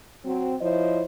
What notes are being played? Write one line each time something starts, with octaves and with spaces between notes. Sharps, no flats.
F#3 C4
F3 E4 C5 C#5 D#5